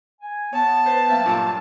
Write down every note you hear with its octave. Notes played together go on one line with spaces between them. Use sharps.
G#5
B3 C#5 A5
B4 C5
F#3 A#3 E5 F5 G5
G2 A#2 F4